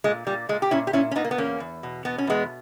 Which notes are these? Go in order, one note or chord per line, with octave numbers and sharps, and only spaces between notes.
A#2 G#3
A#2 G3
A#2 G#3
G4
A#2 C#4 E4
G4
A#2 C#4 E4
C#4
A#2 B3 D#4
A#3
B3
E2 A#3 C#4
E2
B2
B2 B3
C#4
E2 G#3 B3